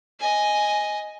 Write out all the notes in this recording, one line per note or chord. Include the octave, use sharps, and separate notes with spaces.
D#5 G#5